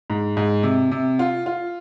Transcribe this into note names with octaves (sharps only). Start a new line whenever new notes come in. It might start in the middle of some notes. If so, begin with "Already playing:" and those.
G#2
G#2
C3
C3
F4
F4